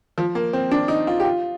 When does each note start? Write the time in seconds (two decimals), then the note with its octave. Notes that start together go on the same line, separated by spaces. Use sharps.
0.18 F3
0.35 A#3
0.53 C4
0.71 D4
0.88 D#4
1.07 F4
1.20 G4
1.25 F4